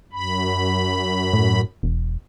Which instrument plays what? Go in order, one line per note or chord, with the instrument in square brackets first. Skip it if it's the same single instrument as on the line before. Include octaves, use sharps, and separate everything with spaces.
[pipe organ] F#2 B5
[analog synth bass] A2
E1